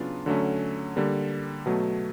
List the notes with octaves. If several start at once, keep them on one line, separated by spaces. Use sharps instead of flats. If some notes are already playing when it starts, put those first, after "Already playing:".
Already playing: C#3 F#3 B3 D4 F4
D3 F#3 A3 C#4
D3 G3 A#3
B2 F#3 A3